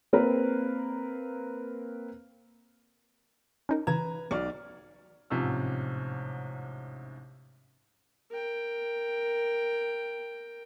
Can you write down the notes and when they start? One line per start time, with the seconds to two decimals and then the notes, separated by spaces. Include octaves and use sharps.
0.13 A#3 C4 A#4 B4
3.69 C#4 D#4 A#4
3.87 C#3 E3 B4 A#5 G#6 E7
4.31 B1 D5 C#6 F6
5.30 A1 G#2 C3 F3 C#4 E6
8.31 A#4 G5